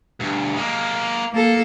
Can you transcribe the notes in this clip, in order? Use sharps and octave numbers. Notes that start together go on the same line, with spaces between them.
D2 G2
G#3 A#3
A#3 A4